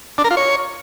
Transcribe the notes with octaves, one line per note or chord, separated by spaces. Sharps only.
D4
A#4
F4
C#5